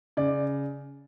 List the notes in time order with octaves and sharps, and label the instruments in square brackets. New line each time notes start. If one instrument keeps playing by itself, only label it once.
[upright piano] C#3 D5